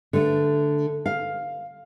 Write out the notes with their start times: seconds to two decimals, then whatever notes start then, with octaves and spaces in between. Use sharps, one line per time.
0.13 D3 A3
1.06 F5